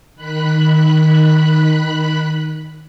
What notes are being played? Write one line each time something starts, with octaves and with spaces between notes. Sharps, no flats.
D#3 B5 F#6